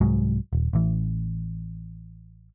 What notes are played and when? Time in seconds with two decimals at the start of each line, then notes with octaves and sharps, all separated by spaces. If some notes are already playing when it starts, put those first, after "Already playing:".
0.01 C2 G#2 F#3 G#3
0.53 D#1
0.73 A1 E3